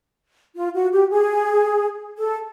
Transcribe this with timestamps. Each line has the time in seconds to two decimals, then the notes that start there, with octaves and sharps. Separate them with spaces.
0.56 F4
0.74 F#4
0.92 G4
1.10 G#4
2.17 A4